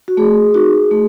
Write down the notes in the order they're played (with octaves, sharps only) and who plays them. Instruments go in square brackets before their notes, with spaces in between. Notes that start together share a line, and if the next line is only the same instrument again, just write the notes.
[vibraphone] F#4
A3 G#4
D#4 F#4
A3